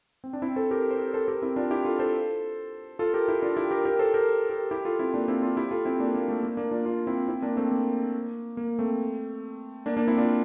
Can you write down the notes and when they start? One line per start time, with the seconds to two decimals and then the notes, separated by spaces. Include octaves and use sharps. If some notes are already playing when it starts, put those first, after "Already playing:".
0.24 C4
0.33 D4
0.42 C4 E4
0.56 A4 C5
0.71 G4 A#4
0.91 C5
0.99 G4 A#4
1.14 A4 C5
1.28 G4 A#4
1.42 C4 E4
1.56 D4 F4
1.71 E4 G4
1.85 F4 A4
1.99 A4 C5
2.99 F4 A4
3.14 G4 A#4
3.28 E4 G4
3.42 D4 F4
3.57 E4 G4
3.71 G4 A#4
3.85 G4 A#4
3.99 A4 C5
4.14 G4 A#4
4.50 G4 A#4
4.71 E4 G4
4.85 F4 A4
4.99 C4 E4
5.14 A#3 D4
5.28 C4 E4
5.42 D4 F4
5.57 E4 G4
5.71 F4 A4
5.85 C4 E4
6.00 A#3 D4
6.14 A#3
6.28 A3
6.43 A#3
6.57 A#3 D4
6.71 D4 F4
6.86 D4 F4
7.07 C4 E4
7.28 C4 E4
7.42 A#3 D4
7.57 A3 C4
7.71 A#3
8.57 A#3
8.79 A3 C4
9.86 A#3 D4
9.97 A#3 D4
10.08 C4 E4
10.18 D4 F4